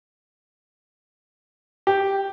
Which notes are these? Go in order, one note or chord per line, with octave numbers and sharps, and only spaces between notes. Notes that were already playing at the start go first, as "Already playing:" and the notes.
G4